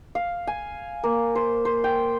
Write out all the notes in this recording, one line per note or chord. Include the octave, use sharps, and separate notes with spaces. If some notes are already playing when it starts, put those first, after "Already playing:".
F5
G#5
A#3
C5
C5
G5